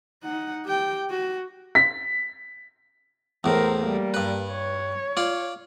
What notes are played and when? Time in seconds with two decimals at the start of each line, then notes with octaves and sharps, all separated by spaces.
0.23 D#4 F#5
0.66 G4 G5
1.11 F#4
1.75 B6
3.44 E2 A2 A#4 C5
3.79 G3 A#3
4.14 G2 B4
4.52 C#5
5.17 F4 D5